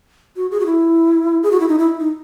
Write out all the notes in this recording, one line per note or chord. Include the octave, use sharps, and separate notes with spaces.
F#4
G#4
F#4
E4
G#4
F#4
E4
D#4
E4
D#4